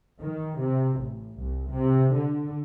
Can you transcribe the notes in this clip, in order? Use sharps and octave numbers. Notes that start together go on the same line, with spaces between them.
D#3
C3
A1
C2
C3
D3